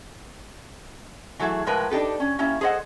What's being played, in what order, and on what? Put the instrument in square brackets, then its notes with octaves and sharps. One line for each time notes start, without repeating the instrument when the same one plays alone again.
[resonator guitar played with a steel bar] E3 F#3 A3 E4 G#4
A2 F3 G#3 A#4 B4
D4 D#4 G4 A4 B4
C#4
A#3 C#4 E4 G4 E5
G#4 A4 C5 D#5 F#5